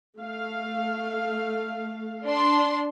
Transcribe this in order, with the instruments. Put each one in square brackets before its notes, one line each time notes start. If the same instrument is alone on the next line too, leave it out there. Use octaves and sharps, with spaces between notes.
[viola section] A3 F5
[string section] D4 C6